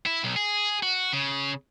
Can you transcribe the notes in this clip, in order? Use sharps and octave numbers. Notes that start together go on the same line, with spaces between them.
E4
B1
G#4
F#4
C#3